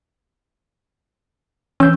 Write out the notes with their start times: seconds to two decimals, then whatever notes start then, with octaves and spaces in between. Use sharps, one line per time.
1.80 E3 C#4 E6 G6